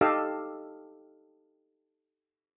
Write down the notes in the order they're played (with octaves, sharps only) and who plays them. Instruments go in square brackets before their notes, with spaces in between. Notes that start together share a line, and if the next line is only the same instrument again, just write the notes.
[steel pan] D#4 G4 A4 D#5 F5 E6